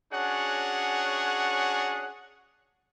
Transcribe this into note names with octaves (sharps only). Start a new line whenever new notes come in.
C#4 D4 F#4 G#4 C#5 F#5